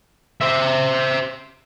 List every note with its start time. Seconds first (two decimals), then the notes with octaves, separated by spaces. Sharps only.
0.41 C5 E5